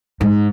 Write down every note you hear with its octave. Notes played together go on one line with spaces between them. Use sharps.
G#2